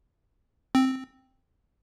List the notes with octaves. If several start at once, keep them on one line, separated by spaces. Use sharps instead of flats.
C4